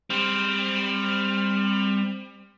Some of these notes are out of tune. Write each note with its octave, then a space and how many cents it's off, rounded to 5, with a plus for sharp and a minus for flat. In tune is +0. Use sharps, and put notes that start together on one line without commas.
G3 +25 C4 +0